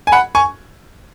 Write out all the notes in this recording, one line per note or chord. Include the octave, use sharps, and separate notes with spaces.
G#5
F#5 B5
G#5 C#6